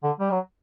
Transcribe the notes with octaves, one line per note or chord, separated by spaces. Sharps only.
D3
G3
F#3